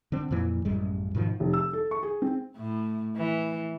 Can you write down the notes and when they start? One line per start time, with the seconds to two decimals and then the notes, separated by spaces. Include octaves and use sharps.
0.12 D3 C4
0.31 F2 A#2 E3
0.65 A1 F#2 G3 G#3
1.15 G#2 B2 D#3 F3
1.40 F1
1.53 E6
1.73 A4
1.91 C#6
2.03 G#4
2.22 C4
2.57 A2
3.16 E3